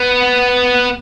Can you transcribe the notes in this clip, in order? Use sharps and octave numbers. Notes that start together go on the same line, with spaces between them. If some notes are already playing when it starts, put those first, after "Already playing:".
Already playing: B3